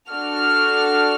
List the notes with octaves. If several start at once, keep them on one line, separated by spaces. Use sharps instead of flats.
D4 F#4 A4 F6